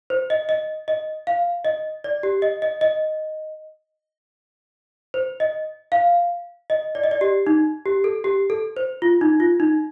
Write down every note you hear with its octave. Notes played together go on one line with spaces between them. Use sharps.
C5
D#5
D#5
D#5
F5
D#5
D5
G4
D#5
D#5
D#5
C5
D#5
F5
D#5
D5
D#5
D5
G4
D#4
G4
A4
G4
A4
C5
F4
D#4
F4
D#4